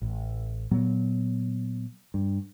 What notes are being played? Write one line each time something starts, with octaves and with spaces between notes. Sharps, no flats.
A1
A#2 F#3 B3
G2